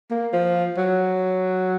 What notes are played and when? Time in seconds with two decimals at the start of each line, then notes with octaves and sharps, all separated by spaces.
0.10 A#3
0.33 F3
0.77 F#3